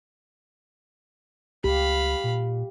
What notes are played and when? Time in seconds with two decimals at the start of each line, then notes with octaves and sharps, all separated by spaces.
1.64 C#2 G4 F5 B5
2.24 A#2